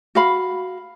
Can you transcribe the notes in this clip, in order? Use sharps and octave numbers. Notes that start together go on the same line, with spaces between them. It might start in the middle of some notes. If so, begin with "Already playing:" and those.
F#4 F5 B5